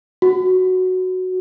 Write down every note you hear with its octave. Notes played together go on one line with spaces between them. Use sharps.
F#4